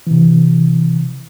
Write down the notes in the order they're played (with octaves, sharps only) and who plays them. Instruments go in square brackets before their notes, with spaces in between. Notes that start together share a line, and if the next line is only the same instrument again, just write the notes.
[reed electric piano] C3 E3